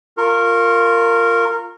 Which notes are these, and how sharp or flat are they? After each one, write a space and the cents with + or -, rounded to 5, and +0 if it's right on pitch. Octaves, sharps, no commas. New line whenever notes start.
F4 +0 A#4 -15 C#6 -35